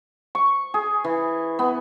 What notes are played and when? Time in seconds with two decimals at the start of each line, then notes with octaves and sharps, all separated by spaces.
0.35 C#6
0.74 G#4
1.04 E3
1.59 B3